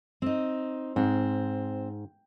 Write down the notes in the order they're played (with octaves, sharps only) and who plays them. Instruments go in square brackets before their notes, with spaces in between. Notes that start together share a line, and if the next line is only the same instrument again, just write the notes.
[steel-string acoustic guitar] C4 D#4
[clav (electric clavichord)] G#2 [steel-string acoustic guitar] C4